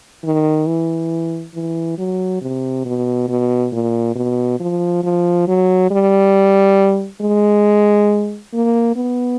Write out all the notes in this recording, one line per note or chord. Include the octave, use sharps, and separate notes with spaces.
D#3
E3
E3
F#3
C3
B2
B2
A#2
B2
F3
F3
F#3
G3
G#3
A#3
B3